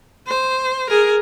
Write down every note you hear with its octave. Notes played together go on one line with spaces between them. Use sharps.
C5
G#4 A#4